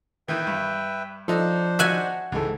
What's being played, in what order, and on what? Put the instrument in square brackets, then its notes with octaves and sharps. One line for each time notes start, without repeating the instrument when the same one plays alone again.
[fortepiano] D#3 E3 [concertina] B4 E5 G5
[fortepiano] G2
[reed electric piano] F3 [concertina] D4 C5 [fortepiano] D#4 A4
[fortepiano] D#4 F#4 [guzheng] E5 F#5 G#5
[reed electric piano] C#2 G#3 A4 [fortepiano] G#2 E3